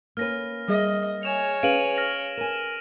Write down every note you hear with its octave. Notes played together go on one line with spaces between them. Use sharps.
A#3 C#4 B4 F6 A#6
G3 G#4 D#5 E5
C#5 G#5 E7 F7
C#4 G#4 B4 F5 D7 D#7 F#7
F6 A#6
A#4 G#5 E7